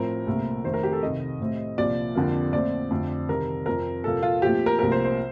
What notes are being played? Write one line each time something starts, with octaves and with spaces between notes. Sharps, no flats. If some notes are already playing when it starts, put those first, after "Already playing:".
Already playing: A2 F3 C4 A#4
C2 A#2 A3 C4
F2 D#3 A3 C4 C5
A#4
G4
A4
C2 C3 D#3 D#5
A2 A3 C4
C2 A#2 F3 D5
F2 D3 F3 A#3
A#2 A3 C4 D5
F2 D3 A3 C4
C2 C3 D#3 G3 C4 A#4
F2 C3 F3 C4 A#4
C2 A#2 F3 A#3 A4
F4
A#2 F3 A3 C4 G4
A#4
C2 A#2 F3 A3 C4 A#4
C5
C5